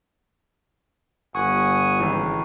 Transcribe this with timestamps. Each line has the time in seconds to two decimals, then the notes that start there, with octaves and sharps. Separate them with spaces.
1.35 G1 F#5 G#5 C#6 D#6
2.00 G#1 C#3 E3 A3